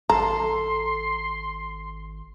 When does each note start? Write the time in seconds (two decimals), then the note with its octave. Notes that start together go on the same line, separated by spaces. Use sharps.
0.10 G#1 A4 A#5 C6